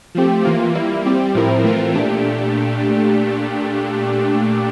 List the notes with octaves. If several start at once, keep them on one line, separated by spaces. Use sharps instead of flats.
F3 A3 C4 G4
E3 A#3 F4
G3 A#3 E4
G3 C4 G4
A2 F3 C4 E4 A#4
E3 A3 C4 F4 A#4
A#2 A3 D4 G4